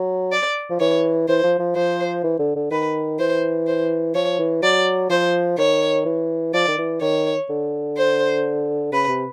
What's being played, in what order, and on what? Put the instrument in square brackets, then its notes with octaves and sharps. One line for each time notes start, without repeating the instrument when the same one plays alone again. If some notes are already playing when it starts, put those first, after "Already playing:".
Already playing: [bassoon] F#3
[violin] D5
[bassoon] F3
[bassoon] E3 [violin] C#5
[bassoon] E3 [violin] C5
[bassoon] F3
F3
[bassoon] F3 [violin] C5
[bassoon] E3
D3
D3
[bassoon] D#3 [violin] B4
[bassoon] E3 [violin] C5
[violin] C5
[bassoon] F3 [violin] C#5
[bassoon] E3
[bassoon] F#3 [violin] D5
[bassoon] F3 [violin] C5
[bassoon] D#3 [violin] C#5
[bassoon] E3
[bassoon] F3 [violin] D5
[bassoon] D#3
E3
[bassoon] D#3 [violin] C#5
[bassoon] D3
[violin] C5
[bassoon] C#3 [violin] B4
[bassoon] C3